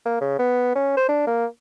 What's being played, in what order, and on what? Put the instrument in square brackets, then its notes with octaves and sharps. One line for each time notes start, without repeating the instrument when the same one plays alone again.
[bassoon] A#3
C#3
B3
C#4
C5
D4
A#3